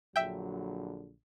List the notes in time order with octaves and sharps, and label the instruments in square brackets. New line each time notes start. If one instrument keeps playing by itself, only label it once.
[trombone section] A#1 D3 F#3 [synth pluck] E5 G5